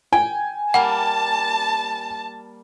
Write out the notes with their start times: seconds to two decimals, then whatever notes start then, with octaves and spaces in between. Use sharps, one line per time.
0.13 G5 G#5
0.74 G3 A#3 F#5 A5